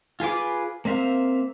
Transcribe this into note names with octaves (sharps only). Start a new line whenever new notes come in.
F4 G#4 B4 D6
A#3 C4 E5 F5